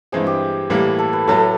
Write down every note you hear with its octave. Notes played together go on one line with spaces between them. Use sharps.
G2 E3 G#3 C4 G#4
G4
A2 E3 G3 A#3
A4
B4
A2 F#3 A3 A4